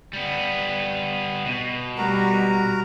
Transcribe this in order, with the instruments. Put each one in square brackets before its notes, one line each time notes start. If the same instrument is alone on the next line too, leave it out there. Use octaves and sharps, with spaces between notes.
[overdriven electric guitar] G3 B3
B2
[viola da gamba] G3 [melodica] F#4 A#4 A#5